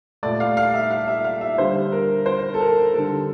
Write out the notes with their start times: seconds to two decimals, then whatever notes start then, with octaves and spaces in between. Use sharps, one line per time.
0.23 A#2 A3 D5
0.40 F5
0.57 F5
0.74 E5
0.91 F5
1.08 E5
1.24 F5
1.41 E5
1.58 D3 G3 C5
1.92 A#4
2.26 C5
2.54 A4
2.60 A#4
2.94 D3 G3 A4